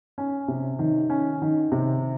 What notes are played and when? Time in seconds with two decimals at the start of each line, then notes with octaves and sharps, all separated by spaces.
0.18 C#4
0.48 C3
0.79 D#3
1.10 C#4
1.42 D#3
1.72 C3